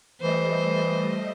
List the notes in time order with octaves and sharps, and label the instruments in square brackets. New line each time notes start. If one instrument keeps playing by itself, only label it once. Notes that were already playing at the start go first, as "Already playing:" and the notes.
[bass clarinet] E3 [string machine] G3 A3 D#5 [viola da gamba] C5